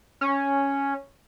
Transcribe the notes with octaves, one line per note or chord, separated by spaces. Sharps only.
C#4